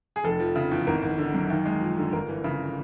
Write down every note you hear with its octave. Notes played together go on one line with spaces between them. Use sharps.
G#4
F1 A4
F3
C#3
E2
G#1 A#4
G#1
D3
F#2
D#2
G#3
F3
D3
G1 A#4
E3
C#3